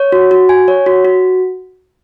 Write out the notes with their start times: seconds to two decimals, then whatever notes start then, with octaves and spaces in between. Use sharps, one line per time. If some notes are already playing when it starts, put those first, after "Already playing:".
Already playing: C#5
0.12 F#4
0.31 F#4
0.49 G#5
0.68 C#5
0.86 F#4
1.05 F#4